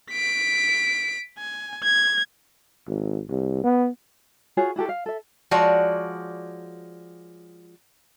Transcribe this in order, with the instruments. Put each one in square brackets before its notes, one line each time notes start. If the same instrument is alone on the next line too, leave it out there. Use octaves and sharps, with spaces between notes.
[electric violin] B6 D7
G#5
G#6
[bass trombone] G#1
C2
B3
[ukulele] F4 F#4 G#4 C#5
E4 F#4 G4 A4
F5
A4 E5
[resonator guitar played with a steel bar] F3 G#3 F#4 C#5 D5